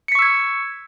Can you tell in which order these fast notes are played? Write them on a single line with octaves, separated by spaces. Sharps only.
C#7 B6 C#6 E6 G#6